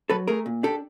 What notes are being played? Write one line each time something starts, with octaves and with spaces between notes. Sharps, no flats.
F#3 A4 B4
A3 G#4 A#4
A#2
D4 G4 A4